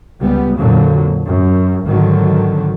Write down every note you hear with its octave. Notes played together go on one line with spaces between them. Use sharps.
C#2 G3 B3
F2 A#2 D3 F#3
F#2
G#1 D3 D#3 F#3